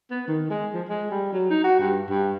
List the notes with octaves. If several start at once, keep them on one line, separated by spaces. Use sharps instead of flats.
B3
D#3
G#3
F3
G#3
G3
F#3
D#4
F#4
G2
G2